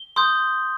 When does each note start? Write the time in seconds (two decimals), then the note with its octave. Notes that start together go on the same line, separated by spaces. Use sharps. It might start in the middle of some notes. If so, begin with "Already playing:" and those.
Already playing: G7
0.16 C6 D#6 G6